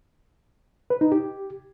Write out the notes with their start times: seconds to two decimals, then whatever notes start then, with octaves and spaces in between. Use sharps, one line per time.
0.90 B4
1.01 D#4
1.12 G4